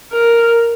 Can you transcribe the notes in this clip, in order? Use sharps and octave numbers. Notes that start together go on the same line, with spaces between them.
A#4